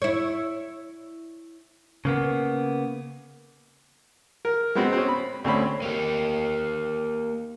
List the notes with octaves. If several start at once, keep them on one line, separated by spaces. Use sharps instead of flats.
E4 C#5
C#3 A#3 B3
A#4
G#3 B3 C4 F#4
C4 C#4
B5
D2 C4 C#4 B5
A#3 G4